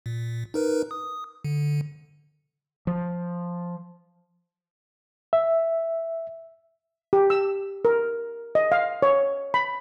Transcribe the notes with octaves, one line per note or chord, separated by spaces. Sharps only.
A#2
D#4 A#4 B4
D#6
D3
F3
E5
G4
E6
A#4
D#5
F5
C#5
B5